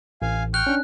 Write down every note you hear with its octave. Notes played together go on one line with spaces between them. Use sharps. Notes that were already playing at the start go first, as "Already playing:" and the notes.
A1 F5 G#5
G5 C#6 F6 F#6
C#4 D4